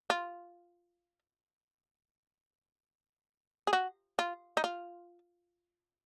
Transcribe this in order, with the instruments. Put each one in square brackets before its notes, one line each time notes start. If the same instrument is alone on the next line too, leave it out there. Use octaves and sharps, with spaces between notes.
[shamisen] F4
G#4
F#4
F4
D#4
F4